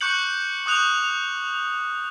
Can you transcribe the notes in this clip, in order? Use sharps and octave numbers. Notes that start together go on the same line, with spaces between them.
C#6 D6 F#6 G6 C#7 F#7
C#6 D#6 F#6 F7